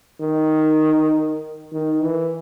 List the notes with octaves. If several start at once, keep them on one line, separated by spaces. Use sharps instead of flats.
D#3
D#3
E3